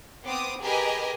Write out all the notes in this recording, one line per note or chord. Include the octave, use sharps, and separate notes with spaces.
B3 C4 D6 D#6
G4 G#4 A#4 B4 D#5 G#5